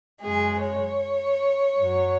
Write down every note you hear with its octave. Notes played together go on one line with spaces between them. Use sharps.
F#2 C#3 G#3 G#4
C#5
F#2 F#3